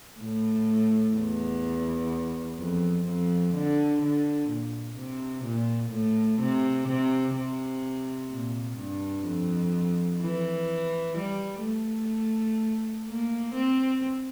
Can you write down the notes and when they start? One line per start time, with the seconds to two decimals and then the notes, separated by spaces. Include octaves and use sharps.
0.20 A2
1.15 E2
2.58 F2
3.06 F2
3.53 D3
4.02 D3
4.49 A#2
4.96 C3
5.44 A#2
5.91 A2
6.40 C3
6.88 C3
7.36 C3
8.30 A#2
8.78 G2
9.26 F2
10.21 E3
11.17 G3
11.64 A3
13.08 A#3
13.55 C4